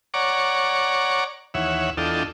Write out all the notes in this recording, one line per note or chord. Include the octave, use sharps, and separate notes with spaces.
C#5 D5 F#5 A#5 C#6 D6
D#2 E3 C#5 E5 F#5
E2 D4 F4 A4 D#5 G5